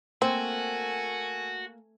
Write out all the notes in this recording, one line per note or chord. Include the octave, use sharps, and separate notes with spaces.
A3 A#3 C4 F#4 G#5